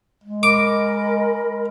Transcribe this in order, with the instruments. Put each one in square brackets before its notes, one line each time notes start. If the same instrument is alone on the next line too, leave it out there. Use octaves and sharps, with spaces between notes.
[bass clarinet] G#3
[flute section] A#4 D#5 B5 [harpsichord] D6